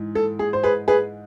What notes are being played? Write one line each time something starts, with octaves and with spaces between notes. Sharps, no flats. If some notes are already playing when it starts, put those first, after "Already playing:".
Already playing: G#2 E3
A4
G#4
C5
G#4 B4
G#4 B4